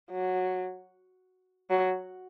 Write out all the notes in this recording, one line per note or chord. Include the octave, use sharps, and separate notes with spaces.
F#3
F#3